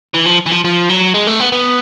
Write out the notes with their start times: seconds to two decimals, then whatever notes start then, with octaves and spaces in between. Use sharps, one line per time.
0.14 E3
0.26 F3
0.46 E3
0.52 F3
0.64 F3
0.90 F#3
1.14 G#3
1.27 A3
1.40 B3
1.52 B3